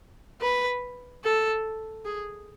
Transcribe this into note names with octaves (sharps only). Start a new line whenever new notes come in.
B4
A4
G#4